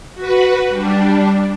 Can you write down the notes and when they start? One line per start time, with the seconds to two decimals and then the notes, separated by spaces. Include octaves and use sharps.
0.15 F#4 B4
0.69 G3 D4